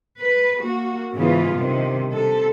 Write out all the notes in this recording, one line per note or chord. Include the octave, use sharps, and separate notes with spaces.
B4
A#3 F#4
G#2 C#3 E3 B3 F4
G2 C3 D#3
C3 A4